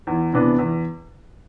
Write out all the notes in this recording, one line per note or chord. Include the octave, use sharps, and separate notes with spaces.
E2
C3 E3 B3 D4
E2